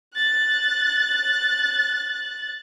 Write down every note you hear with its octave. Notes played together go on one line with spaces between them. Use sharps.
F#6 A6